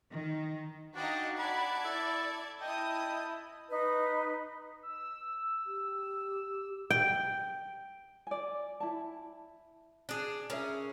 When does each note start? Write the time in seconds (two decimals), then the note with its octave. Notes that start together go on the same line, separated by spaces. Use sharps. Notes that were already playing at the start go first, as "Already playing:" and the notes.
0.11 D#3
0.96 D4 D#4 F#4 D#5 F5 G5
1.39 D5 F#5 A5 B5 G#6
1.84 E4 A4
2.62 E4 D#5 G5 A5 D#6
3.69 D#4 B4
4.83 E6
5.66 G4
6.90 G5
8.27 D5 G#5
8.80 E4 A5
10.09 D4 G#4
10.50 C#4 G#4 A#4 E5